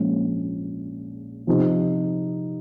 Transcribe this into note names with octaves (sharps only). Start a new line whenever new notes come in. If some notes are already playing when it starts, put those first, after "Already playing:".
Already playing: A#1 A#2 F3 G#3 C#4
C3 F3 C4 D#4